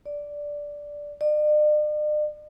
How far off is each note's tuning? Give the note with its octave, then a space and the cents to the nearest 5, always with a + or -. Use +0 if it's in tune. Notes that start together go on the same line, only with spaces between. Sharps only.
D5 -5
D5 +45